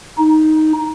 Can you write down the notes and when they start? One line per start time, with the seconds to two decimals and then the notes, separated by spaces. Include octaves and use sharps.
0.19 D#4